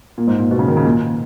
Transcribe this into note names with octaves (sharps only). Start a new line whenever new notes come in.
A#2
G#2
A#2
B2
C#3
D#3
C#3
A#2